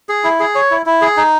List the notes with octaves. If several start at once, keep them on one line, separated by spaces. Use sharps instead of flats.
G#4
E4
G#4
C#5
E4
E4
G#4
D#4